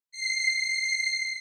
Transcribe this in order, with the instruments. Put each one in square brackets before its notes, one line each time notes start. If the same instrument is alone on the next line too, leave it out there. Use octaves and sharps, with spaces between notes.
[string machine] C7